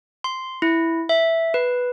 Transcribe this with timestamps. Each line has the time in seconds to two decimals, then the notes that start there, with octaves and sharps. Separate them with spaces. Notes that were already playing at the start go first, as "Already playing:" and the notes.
0.24 C6
0.62 E4
1.09 E5
1.54 B4